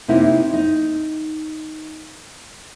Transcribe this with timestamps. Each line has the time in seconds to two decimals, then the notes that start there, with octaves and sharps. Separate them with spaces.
0.08 C3 A#3 D#4 E4
0.53 D#4